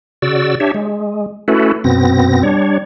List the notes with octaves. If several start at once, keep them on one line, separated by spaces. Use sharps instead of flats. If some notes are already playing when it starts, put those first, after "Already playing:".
C#3 F#4 D5 E6
D4 G4 C#5 E5
G#3
A3 C#4 E4 F#4 A4 B4
F#2 B2 B3 C4 A#6
G3 D4 C#5